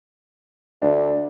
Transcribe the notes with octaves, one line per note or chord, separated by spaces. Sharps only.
D2 D4